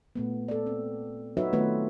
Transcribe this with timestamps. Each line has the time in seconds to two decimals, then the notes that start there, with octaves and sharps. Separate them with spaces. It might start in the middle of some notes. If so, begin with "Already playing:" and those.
0.16 A#2 A3 B3
0.48 A4 D5
0.66 C4
1.37 F#3 D#4 F#4 B4 C#5 E5
1.53 D#3 A3 B3 C4 F4 B4